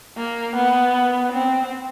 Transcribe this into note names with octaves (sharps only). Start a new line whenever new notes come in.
A#3
B3
C4